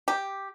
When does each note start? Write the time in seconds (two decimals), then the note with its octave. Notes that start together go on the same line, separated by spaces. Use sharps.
0.08 G4